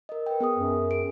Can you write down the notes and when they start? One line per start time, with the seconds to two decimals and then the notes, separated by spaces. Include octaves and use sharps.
0.09 A#4 D#5
0.26 B4 G5
0.40 B3 G#4 D#6
0.56 F#2
0.91 G#4 D7